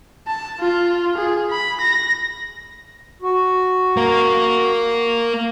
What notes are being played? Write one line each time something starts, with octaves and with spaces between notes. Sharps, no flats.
A5
F4
G#4
B5
A#6
F#4
A#3 A#4